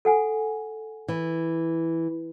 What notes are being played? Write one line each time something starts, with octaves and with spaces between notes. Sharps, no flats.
A4 F#5 G#5
E3